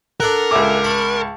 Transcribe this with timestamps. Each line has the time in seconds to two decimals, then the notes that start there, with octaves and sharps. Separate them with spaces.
0.20 D4 A4 A#4 F#5
0.51 C#2 E5 G#5 D6
0.84 A5 B5 C#6